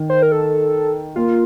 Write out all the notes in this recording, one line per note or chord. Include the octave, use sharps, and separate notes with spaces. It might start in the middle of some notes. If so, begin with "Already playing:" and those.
Already playing: D#3
C5
A#4
A4
A#3 F4